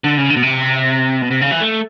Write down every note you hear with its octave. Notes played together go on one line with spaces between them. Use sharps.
D3
C#3
D3
B2
C3
B2
C3
C#3
E3
A3